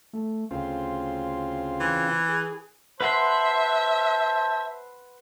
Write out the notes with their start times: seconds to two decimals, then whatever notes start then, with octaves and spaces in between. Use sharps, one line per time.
0.13 A3
0.51 D2 C#3 C4 F4
1.80 E3
2.29 G#4
3.01 B4 C5 E5 F#5 A5 C6